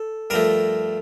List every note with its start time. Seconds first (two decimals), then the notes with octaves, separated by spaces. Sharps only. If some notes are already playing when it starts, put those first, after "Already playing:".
Already playing: A4
0.30 G2 F3 A3 A#4